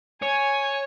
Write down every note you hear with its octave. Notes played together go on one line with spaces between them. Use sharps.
C#5 G#5